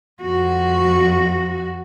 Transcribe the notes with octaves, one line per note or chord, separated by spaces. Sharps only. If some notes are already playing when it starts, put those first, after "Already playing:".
F2 F#4